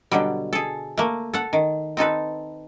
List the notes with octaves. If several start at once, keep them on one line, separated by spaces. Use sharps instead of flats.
B2 D3 F#3 G3
G#4 A4
A3 A#3
A4 F#5
D#3
C4 D#4 A4 B4